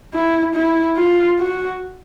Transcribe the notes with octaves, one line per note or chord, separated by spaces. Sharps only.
E4
E4
F4
F#4